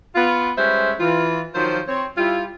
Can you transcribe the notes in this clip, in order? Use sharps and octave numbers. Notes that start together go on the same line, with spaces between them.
B3 F4
G3 G#3 C#4 B4 C5 E5
E3 F4
D#3 F3 F#3 F4 C5
C4 C#5
G3 E4 F4